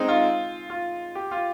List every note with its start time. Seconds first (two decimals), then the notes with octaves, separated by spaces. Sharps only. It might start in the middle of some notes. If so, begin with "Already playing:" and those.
Already playing: G#3 C4 D#4
0.08 F4
0.70 F4
1.15 G4
1.31 F4